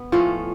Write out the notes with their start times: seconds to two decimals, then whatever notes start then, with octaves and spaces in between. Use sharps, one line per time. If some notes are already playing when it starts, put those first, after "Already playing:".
Already playing: B3
0.12 A2 F3 A3 C#4 F4